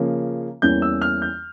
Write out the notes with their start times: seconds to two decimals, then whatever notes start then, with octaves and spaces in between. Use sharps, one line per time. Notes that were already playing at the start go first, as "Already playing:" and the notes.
Already playing: C#3 F3 A#3
0.62 E2 E3 G3 A#3 C#4 G6
0.82 E6
1.02 F6
1.22 G6